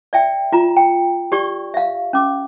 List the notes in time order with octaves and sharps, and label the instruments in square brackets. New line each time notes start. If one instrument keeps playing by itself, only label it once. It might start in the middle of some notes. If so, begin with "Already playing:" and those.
[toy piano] D5 E5 G5
F4 A#5
G5
G4 D5 C#6
E5 F5
C#4 D6